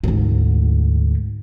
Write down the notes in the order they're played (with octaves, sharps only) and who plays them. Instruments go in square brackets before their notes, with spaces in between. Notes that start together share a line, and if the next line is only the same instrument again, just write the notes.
[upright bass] D2 G#2